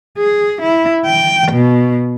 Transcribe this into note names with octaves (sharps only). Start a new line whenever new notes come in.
G#4
E4
G5
B2